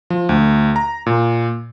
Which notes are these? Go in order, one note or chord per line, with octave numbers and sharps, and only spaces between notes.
F3
D2
A#5
A#2